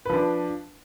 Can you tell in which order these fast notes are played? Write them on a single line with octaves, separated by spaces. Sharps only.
B4 F3 D4